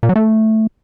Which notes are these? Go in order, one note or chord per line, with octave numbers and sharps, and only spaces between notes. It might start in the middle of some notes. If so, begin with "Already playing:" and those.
A#2
F#3
A3